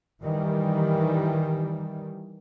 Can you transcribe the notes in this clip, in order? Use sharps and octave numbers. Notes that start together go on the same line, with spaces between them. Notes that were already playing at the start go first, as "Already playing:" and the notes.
D#3 E3 G3